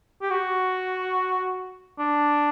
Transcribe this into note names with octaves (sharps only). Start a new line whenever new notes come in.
G4
F#4
D4